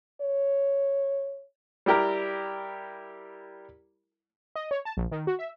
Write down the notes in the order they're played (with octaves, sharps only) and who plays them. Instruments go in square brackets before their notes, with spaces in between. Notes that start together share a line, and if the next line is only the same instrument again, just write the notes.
[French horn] C#5
[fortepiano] G3 E4 G4 A#4 A#5
[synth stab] D#5
C#5
A5
A#1
D#3
F#4
E5